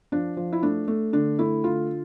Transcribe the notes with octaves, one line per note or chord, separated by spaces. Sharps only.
F3 D4
F3
E4
A3 D4
A3
D3 D4
A3 E4
D3 F4